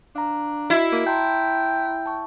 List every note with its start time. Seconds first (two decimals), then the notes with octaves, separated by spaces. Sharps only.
0.16 D4 F5 A#5
0.70 E4 F#4 D#5 C7
0.92 A#3
1.07 G5 A5 A#5 C6
2.06 A5 C#6